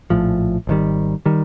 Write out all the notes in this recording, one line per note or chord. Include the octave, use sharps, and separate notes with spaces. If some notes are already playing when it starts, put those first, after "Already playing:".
A#1 A2 F3
G#1 G2 D#3 G3
D#3 G3